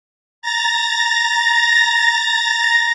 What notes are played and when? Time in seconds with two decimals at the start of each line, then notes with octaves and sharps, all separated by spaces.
0.42 A#5 A6 A#6